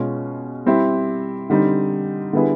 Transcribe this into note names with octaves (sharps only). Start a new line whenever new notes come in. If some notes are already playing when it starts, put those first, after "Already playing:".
Already playing: B2 G#3 C#4 F4
G3 C4 E4 G4
D3 G3 C4 D#4
D3 G3 B3 E4 G#4